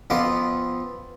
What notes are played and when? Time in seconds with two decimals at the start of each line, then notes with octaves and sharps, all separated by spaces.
0.10 F2 B3 F4 D6